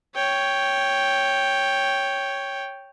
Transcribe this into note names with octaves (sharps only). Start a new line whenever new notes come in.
C#5 G5